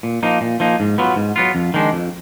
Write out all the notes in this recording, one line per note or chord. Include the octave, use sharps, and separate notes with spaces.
A#2
F3 A#3 D#4
A#2
F3 A#3 D#4
G#2
F#3 B3 F4
G#2
F#3 B3 F4
F2
D#3 G#3 D4
F2